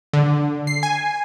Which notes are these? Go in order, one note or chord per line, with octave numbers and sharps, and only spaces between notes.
D3
C7
G#5